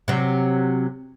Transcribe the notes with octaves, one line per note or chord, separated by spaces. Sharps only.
C3 F#3